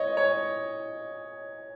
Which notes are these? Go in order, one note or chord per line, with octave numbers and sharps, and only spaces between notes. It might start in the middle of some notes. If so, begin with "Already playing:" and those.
Already playing: C#5 D#5
C#5